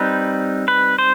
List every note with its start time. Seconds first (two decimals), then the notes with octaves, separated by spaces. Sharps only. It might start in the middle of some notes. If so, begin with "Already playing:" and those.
Already playing: G3 C4 D#4 B4
0.68 B4
0.99 C5